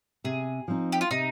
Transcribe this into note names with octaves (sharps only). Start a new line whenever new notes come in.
C3 G#4
F3 C4 D#4
G4
F4
C3 D#4